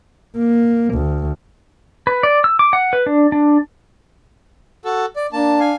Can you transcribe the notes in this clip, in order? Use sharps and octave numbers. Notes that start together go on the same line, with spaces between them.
A#3
D2
B4
D5
E6
D6
F#5
B4
D4
D4
F#4 A4
D5
A#3 D4 A5
F5 G#5